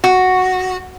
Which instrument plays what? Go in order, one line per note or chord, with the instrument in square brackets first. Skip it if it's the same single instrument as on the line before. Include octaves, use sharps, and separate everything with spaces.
[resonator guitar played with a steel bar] F#4